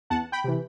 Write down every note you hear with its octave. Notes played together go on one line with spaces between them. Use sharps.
E2 F#5 A5
G5 B5
C3 E3